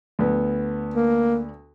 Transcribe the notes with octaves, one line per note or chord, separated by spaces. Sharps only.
D2 B3
A#3